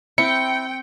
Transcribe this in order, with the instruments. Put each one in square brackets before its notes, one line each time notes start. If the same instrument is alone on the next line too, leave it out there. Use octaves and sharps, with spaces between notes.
[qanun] C4 [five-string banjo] E4 [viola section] G5 [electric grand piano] C#7